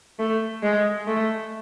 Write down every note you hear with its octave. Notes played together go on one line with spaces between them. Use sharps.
A3
G#3
A3